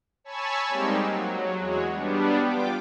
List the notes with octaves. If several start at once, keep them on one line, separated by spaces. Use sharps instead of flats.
C#5 G#5 A5 B5 C#6 E6
G3 G#3 A#3 C4 D#4 G4
F#3
E2 G#3 F#4 C#5
G3 B3 D4
F4 G5 D6